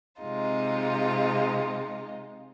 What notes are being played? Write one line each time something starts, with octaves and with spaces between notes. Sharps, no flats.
C3 G#3 D#4 F4